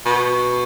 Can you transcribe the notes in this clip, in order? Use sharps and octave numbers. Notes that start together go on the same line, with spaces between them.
B2